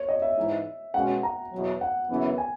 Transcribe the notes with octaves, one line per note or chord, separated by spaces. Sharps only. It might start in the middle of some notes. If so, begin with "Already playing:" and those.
Already playing: C#5
D#5
E5
G#2 E3 G#3 D#4
B2 G#3 C#4 F#4 F#5
A#5
E2 B2 F#3
F#5
F#2 C#3 E3 B3
G#5